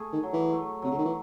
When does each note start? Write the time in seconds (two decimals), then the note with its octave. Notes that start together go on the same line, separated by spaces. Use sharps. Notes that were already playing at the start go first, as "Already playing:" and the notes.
Already playing: A3 G#4
0.13 D#3
0.23 F#3
0.33 E3
0.53 A3
0.82 C3 F#3
0.91 C#3
0.97 D#3
1.05 E3